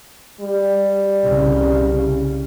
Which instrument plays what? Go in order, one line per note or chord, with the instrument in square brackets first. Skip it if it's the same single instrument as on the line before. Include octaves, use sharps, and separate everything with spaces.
[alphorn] G3
[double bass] C2 C#3